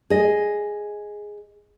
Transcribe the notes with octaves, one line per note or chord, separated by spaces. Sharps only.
G#4 D#5